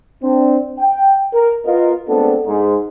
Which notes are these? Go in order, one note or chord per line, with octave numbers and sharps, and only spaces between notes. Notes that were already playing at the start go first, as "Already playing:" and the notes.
C4 D4
G5
A#4
B3 F4 A#4 D#5
G#3 A3 B3 C4 D4 A4
G#2